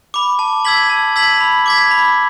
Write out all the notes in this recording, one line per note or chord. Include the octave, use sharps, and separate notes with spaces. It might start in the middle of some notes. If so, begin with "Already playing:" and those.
B5 D6
A5
E6 G#6 B6 F#7
A5
E6 G#6 B6 F#7
B5
D6 G#6 B6
B5